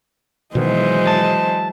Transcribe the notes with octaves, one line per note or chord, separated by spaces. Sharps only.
B2 D#3 E3 F#3 G#3 C5 D#5
A5